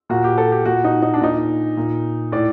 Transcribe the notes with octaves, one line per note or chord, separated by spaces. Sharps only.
A#2 F#4
G4
A4
G4
A#2 F#4
D#4
D#4
D4
A#2 D#4
A#2
A2 D5